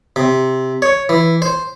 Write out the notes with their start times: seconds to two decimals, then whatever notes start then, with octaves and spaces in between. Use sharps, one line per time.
0.16 C3
0.82 C#5
1.09 E3
1.42 C5